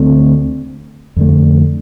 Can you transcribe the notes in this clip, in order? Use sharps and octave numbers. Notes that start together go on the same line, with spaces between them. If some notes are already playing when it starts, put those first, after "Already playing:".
Already playing: D2 D3 A3 C4
F2 D3 A3